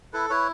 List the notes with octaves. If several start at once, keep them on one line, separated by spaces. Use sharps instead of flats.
E4 A4 B4
E4 B4 C#5